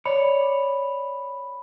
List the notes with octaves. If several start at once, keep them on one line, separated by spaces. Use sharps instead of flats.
C#5 D5 B5